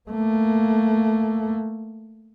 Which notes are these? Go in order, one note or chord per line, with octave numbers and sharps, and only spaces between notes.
A3 A#3